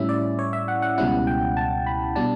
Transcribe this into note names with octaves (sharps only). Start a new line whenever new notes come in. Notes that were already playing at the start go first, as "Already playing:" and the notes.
Already playing: A2 G3 C#4 E4 E5
D5
C#5
E5
F#5
F#5
C#2 B2 G3 C#4 E4 F#5
G5
A5
B5
B2 G3 D4 A5